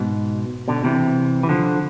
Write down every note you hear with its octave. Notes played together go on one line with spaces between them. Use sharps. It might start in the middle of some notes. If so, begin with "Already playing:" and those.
Already playing: G#2 B2
B2 D3
C3 E3
E3
D3 F3